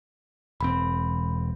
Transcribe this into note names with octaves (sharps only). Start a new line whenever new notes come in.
E1 C4 B5